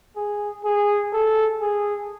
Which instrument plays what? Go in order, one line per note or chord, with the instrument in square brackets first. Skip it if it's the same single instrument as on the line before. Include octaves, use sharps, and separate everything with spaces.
[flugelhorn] G#4
G#4
A4
G#4